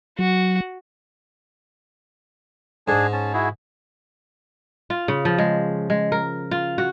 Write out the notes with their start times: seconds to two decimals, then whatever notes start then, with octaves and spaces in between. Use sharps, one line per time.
0.19 F#3 F#4
2.88 G#2 D4 G#4
3.13 C#4 A5
3.33 E4 F#4 G#4
4.90 F4
5.08 C#3
5.25 F3
5.38 G#3
5.90 G#3
6.12 A#4
6.51 F4
6.78 F#4